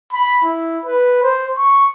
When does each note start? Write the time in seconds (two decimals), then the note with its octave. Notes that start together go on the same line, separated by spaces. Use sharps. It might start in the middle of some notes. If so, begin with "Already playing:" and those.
0.13 B5
0.44 E4
0.85 B4
1.23 C5
1.58 C#6